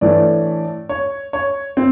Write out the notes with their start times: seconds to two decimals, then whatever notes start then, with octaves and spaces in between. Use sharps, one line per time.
0.01 A2 E3 A3 D4 D5
0.89 C#5
1.33 C#5
1.77 C4